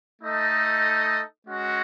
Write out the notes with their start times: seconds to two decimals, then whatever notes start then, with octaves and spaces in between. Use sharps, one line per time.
0.22 A3 D#4 A4 D#5
1.47 G#3 C#4 F#4